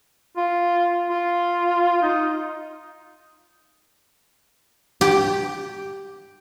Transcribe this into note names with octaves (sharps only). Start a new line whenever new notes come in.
F4
F4
D#4
G4